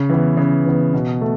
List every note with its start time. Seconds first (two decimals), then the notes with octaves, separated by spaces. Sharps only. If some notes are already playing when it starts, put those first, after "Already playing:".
Already playing: C#3
0.10 E3 B3
0.37 C#3
0.66 E3 B3
0.94 B2
1.21 A3